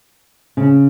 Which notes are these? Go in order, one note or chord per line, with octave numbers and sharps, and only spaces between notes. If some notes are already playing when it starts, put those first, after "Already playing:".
C#3